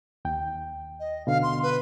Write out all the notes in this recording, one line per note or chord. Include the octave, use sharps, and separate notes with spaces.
D#2 G5
D#5
B2 D3 F5
C6
B4